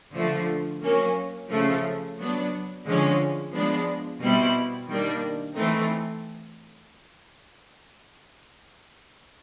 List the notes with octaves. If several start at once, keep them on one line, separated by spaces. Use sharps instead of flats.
D3 F3 A3
F#3 A#3 C#4
C#3 F3 A3
F#3 B3 D4
D3 F3 G#3 C#4
F3 G#3 B3 D4
B2 G3 C4 E4
D#3 G3 A#3 D4
E3 A3 C4 D#4